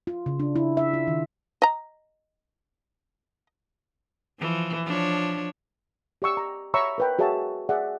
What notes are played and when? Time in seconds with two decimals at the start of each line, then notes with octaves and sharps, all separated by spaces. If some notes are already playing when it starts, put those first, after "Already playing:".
0.07 F4
0.26 C#3
0.40 D4
0.56 E4
0.77 E5
0.94 F4
1.07 D#3
1.62 D#5 A#5
4.39 E3 F3
4.84 F3 D4 C#5
6.22 G4 D5 C#6 E6
6.37 A#5
6.74 C#5 E5 A#5 B5 C#6 E6
6.98 A#4 B4 G5
7.19 F#4 G#4 C#5 E5 A5
7.69 G#4 D5 E5 F#5